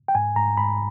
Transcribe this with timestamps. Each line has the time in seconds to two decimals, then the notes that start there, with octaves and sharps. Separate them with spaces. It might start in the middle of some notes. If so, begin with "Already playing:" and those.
0.08 G5
0.15 G#2 G#5
0.36 G#2 A#5
0.57 G#2 B5